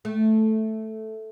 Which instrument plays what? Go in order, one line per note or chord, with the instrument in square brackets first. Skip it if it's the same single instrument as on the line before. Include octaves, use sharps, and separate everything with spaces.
[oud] A3